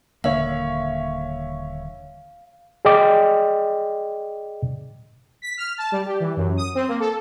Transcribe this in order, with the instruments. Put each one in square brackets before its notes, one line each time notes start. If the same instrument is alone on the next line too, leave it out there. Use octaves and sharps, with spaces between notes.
[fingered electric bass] D#1 D3 A#3 [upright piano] C#5 E5 [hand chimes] F5
[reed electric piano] G#4 D5 D#5 G5 D6
[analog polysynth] B6
F6
A5
G3
G4
E3
F#2
D#6
C4
A#3
A4